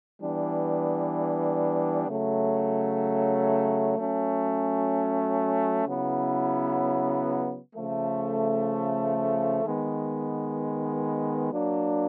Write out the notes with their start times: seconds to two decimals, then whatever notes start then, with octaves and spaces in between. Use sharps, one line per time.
0.20 E3 G3 B3 D4
2.08 C#3 F#3 A3
3.97 F#3 A3 C#4
5.86 C#3 F#3 B3 E4
7.75 C#3 F3 A3
9.63 D#3 G#3 B3
11.52 F#3 A#3 D4